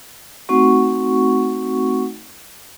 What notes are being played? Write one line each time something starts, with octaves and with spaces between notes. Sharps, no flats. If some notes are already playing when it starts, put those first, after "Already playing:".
A3 C4 D#4 F#4 F#5 C#6